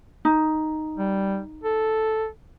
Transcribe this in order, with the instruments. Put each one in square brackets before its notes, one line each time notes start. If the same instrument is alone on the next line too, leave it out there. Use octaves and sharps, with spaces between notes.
[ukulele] D#4
[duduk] G3
A4